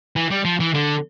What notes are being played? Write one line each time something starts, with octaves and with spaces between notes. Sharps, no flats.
E3
G3
F3
E3
D3